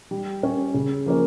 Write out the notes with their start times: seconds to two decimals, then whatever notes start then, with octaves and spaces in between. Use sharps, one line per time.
0.11 G3
0.43 C#4 G4
0.74 C#3
1.06 F3 A#3 C#4